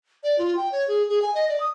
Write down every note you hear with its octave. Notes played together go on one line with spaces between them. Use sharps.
D5
F4
G5
C#5
G#4
G#4
G#5
D#5
D5
D#6